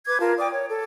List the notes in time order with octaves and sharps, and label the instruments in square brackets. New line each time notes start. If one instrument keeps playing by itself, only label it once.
[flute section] B4 D6 G#6
F4 A#4 A5
D5 G5 D6 D#6
C#5
A4